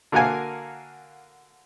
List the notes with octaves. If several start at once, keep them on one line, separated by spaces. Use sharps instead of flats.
D3 A#3 F#4 A#4 F5 G#5